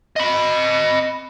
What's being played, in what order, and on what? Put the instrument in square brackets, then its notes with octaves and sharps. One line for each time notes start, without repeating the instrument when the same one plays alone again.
[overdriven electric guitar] D#5 B5